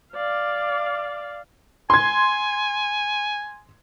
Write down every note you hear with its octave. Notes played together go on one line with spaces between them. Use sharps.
D5 F5
G#5 C6 G#6